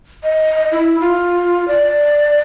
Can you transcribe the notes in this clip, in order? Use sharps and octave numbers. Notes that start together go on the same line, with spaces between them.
D#5
E4
F4
D5